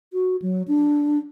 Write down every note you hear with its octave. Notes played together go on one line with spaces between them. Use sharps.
F#4
F#3
D4